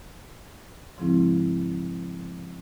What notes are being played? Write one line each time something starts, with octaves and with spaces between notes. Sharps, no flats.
G#2 C#3 F3 G#3 C4 E4